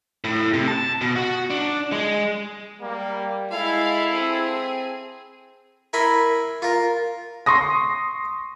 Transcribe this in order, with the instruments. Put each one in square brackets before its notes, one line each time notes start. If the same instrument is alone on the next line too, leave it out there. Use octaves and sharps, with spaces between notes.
[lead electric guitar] A2
C3
A5
B2
F#4
D4
G#3
[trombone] G3 [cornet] A#3
[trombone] G#3 [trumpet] E4 [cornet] A4 [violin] F5
[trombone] C4 [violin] G#4
[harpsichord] E4 A#4 G#5 B5 C6
F4 A#4
[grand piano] C6 C#6 D#6 A#6